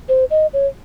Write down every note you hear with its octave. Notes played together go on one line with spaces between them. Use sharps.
C5
D#5
C#5